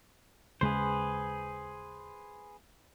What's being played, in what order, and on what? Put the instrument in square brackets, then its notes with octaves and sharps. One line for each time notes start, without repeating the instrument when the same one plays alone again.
[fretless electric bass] D#2 C#3 G#3 [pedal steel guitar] G#4 B4 C5